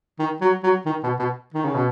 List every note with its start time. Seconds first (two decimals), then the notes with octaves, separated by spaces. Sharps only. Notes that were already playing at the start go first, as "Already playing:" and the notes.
0.19 D#3
0.41 F#3
0.63 F#3
0.86 D#3
1.03 B2
1.19 B2
1.54 D#3
1.65 C#3
1.74 B2